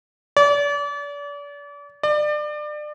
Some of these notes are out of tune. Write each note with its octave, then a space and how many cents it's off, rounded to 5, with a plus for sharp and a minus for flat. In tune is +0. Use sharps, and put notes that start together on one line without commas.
D5 -35
D5 +30